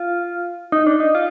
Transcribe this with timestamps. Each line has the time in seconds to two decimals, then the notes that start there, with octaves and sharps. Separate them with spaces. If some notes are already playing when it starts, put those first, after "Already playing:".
Already playing: F4
0.72 D#4
0.87 D4
1.00 D#4
1.15 F4